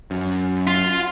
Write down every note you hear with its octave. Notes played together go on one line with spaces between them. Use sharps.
F#2
F4